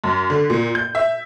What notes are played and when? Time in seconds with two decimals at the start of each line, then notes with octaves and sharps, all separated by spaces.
0.04 F#2
0.30 D3
0.50 A#2
0.75 G6
0.95 E5